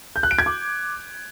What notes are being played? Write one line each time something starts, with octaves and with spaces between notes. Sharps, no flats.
G6
F#6
D7
G#6
D6